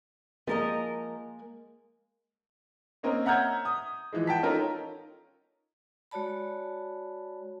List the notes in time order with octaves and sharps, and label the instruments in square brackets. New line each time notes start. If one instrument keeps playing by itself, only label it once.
[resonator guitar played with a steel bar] F3 A#4 D#5 [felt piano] G#3 A#3
[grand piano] A#3 C4 C#4 A#4 D#5
E5 F#5 A#5 F6 G6 G#6
D#6
E3 F3 G#3
F#5 G5 A5 B6
C#4 D#4 F4 A4 A#4
[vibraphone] G#3 F#4 C#5 D5 A5 B5